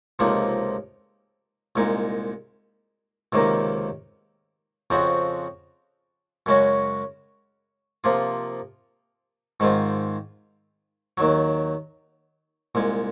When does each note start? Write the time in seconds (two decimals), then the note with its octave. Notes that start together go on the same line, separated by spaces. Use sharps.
0.19 C#2 C3 F3 A#3 D#4
1.76 C2 A#2 G#3 D#4
3.32 C#2 C3 D#3 A#3 D#4
4.90 F2 C#3 F3 C4 F#4
6.46 F#2 C#3 G#3 C#4 F#4
8.04 C3 F3 A#3 F4
9.60 G#2 D#3 G#3 C4 F4
11.18 D#2 D#3 F#3
12.75 C2 A#2 G#3